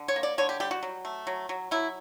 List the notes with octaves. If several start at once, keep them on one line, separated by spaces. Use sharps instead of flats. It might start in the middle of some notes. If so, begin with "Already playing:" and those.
Already playing: D3
C#5
A#3
D5
D3 C#5
G4
G3 G4
F#4
F#3
A3
F#3
F#3
F#3 E4